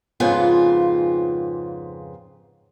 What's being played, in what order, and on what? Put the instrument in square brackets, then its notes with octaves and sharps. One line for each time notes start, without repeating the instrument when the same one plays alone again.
[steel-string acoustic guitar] F2 G#2 C#3 B3 F4 G#5